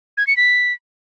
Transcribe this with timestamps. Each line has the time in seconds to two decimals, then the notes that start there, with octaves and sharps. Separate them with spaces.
0.17 G#6
0.27 C#7
0.37 B6